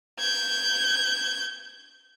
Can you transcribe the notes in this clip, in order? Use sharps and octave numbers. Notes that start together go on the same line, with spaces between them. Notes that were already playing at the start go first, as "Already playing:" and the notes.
G6 G#6